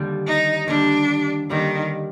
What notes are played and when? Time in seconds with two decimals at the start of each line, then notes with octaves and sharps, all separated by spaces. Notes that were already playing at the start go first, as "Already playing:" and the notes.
Already playing: D#2 D3 G3
0.27 D#4
0.67 D#2 D3 G3 D4
1.50 D#2 D3 D#3 G3